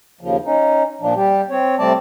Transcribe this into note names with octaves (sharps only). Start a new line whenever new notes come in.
D#2 C#3 F3
C#4 D#4
A#2 F3 D4
G3 G4
C4 C#5
C3 G3 A3 C4 D5 A5